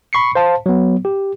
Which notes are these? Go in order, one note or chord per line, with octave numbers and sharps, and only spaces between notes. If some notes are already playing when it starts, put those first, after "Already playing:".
B5 C#6 C7 C#7
C5 F5 A5
F#3 B3
G4